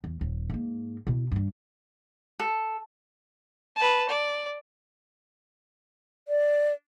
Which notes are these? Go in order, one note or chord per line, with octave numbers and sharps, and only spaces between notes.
E2
D#1
G#2 A#3
B2 E4
G2 D4
A4
B4 A5
D5
D5